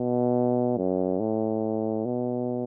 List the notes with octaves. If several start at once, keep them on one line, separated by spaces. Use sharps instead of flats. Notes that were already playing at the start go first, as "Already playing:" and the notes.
Already playing: B2
F#2
A2
B2